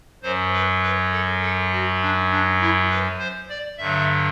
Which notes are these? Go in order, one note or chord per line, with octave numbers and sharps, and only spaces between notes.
F#2 F#3 C5
B4
B4
A4
A4
F#4
D4
D4
E4
B4
C5
D5
G2 D3 F#3 E5